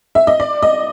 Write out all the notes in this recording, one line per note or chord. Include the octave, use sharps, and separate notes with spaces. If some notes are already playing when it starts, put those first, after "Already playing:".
E5
D#5
D5
D#5